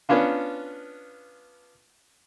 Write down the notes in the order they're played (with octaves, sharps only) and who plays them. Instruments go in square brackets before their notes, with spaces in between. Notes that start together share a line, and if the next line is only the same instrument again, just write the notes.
[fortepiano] B3 C#4 D4 F4